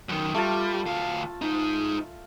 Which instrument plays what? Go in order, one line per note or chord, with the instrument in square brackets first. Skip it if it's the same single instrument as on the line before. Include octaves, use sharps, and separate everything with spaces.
[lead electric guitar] F#2 D#3
[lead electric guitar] G3 [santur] A3 F4 A5
[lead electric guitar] D2 F5
G#2 D#4